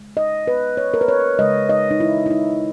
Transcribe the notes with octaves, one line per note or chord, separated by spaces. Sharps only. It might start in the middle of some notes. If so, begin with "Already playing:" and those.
Already playing: C#3 G#3
D#5
B4
C#5
A#4
B4
C#5
C#3 G#3 D#5
D#5
D#4
E4
E4
D#4